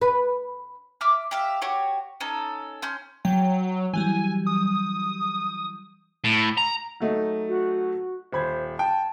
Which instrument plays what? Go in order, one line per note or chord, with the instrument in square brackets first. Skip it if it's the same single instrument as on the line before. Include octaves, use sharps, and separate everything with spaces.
[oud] B4
[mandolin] E5 D6 F6
G4 E5 F5
F#4 G4 C#5
C#4 D#4 A4
C#4 C6 G6
[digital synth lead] F#3 [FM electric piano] G5
[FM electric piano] E3 F#3 G3 [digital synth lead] G#5
[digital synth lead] D#6
[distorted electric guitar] A2
A#5
[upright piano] F#3 A3 D#4
[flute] F#4
[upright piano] D#1 B5 G#6 [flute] C5
[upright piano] G5 [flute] A5